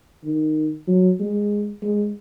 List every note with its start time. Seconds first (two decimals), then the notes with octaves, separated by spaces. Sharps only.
0.24 D#3
0.88 F#3
1.19 G#3
1.82 G#3